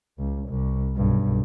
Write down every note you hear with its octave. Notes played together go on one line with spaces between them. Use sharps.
C#2
C2
B1 G2